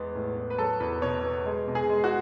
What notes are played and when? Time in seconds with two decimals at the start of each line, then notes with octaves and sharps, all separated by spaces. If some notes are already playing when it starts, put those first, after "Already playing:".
Already playing: E2 G#3 B3
0.15 A2
0.36 B3
0.50 B4
0.58 F#3 A4
0.80 E2 B4
1.02 B2 C#5
1.24 B3
1.46 G#3
1.68 B2
1.75 G#4
1.90 G#3
2.04 F#4